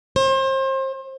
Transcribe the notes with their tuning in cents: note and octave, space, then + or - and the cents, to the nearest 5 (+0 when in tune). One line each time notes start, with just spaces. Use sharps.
C5 +35